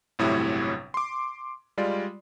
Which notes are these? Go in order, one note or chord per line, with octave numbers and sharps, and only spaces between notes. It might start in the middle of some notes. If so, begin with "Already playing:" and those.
G1 A2 C3 F#3 E4 C#5
C6 D6
G3 G#3 F4 D5